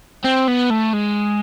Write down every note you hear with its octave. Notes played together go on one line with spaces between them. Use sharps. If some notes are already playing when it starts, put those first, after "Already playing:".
C4
B3
A3
G#3